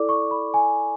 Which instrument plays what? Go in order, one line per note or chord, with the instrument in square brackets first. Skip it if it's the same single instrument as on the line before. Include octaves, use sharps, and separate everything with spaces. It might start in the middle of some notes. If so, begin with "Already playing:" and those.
Already playing: [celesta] E4 A4 D5 D6
C#6
B5
G#5